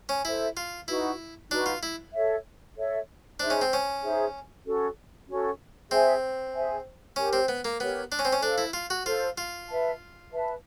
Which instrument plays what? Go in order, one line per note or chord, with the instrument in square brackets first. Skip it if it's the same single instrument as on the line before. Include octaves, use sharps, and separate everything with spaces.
[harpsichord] C#4
[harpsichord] E4 [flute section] A4 C5 E5
[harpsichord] F4
[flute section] D#4 F#4 B4 [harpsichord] E4
[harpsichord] D4 [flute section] D#4 F#4 B4
[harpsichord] F4
E4
[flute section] A4 C#5 E5
A4 C#5 E5
[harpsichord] D4 [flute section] D#4 G#4 C5 E5
[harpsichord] C#4
C4
C#4
[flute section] D#4 G#4 C5 E5
C#4 F#4 A4
C#4 F#4 A4
[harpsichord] C4 [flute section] G#4 C5 E5 G#5
[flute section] G#4 C5 E5 G#5
[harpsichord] C#4 [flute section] G4 A#4 C#5
[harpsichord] C4
B3
A#3
[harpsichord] B3 [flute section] G4 A#4 C#5
[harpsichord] D4
C#4
C4
C#4
[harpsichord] D4 [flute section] A4 C5 F5
[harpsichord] E4
F4
F#4
[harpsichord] F4 [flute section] A4 C5 F5
[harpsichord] F4
[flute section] B4 E5 A5
B4 E5 A5